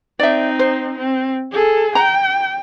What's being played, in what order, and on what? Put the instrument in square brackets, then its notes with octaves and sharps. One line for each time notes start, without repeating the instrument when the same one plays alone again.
[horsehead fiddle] C4 D#4 [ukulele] D5 E5
[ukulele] C5
[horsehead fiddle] C4
G#4 A4
[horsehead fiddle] G5 [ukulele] A#5